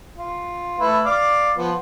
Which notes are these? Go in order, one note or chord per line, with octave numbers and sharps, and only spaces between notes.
F4
A3 E4 B4
D5 F5 D6
F3 B3